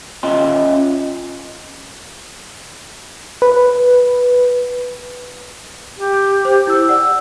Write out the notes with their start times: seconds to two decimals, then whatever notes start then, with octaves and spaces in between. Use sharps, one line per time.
0.23 C#4 F4 D#5 E5 G5 C6
3.42 B4
5.99 G4
6.14 G6
6.45 C5
6.67 E4 E6
6.88 D5 F#5 E6